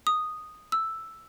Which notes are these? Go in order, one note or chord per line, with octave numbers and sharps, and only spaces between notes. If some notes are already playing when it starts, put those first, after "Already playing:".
D#6
E6